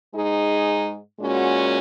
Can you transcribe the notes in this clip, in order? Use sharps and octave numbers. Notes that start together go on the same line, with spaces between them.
G#2 G#3 D#4 G#4
A#2 G#3 C#4 F#4